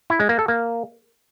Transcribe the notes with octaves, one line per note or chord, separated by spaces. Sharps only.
E4
G#3
A#3
A4
A#3